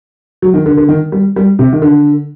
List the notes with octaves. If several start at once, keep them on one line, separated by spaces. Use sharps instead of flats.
F#3
D#3
D3
D3
D#3
G3
G3
C3
D#3
D3